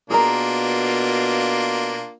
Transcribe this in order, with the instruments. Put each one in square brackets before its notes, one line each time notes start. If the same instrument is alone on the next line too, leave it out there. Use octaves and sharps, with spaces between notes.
[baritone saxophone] B2 [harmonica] A#3 D4 F4 [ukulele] G#4 A#4 A#5